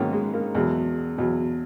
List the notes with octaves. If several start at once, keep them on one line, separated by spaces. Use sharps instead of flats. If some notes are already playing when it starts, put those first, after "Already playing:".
Already playing: G#2 D#3 F#3 A#3 B3 C#4 D#4
G#3
A#3
E2 B2 F#3 G#3
E2 B2 F#3